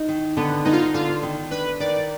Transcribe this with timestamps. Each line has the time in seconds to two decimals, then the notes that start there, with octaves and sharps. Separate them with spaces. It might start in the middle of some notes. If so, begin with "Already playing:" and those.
Already playing: D#4
0.08 D#3
0.37 D3 B3
0.65 B3 D#4
0.72 F4
0.81 D#4
0.94 D3 F4
1.23 D#3
1.51 D4 B4
1.80 D#3 D5